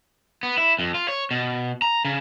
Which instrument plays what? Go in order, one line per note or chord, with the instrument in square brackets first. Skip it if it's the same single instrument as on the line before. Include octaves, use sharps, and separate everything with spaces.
[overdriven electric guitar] B3
E4
F2
F4
C#5
B2
A#5
C#3